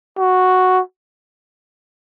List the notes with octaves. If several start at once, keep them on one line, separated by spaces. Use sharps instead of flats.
F#4